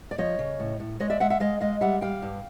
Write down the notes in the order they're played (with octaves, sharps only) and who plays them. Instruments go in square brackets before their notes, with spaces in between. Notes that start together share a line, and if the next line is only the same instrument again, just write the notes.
[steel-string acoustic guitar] D5
F3 C#5 D#5
C#3
A2
A2
G#3 C#5 D#5
D5 E5
G#3 E5 F#5
E5 F#5
G#3 D#5 F5
G#3 D#5 F5
G3 E5 F#5
G3 F5 G5
G2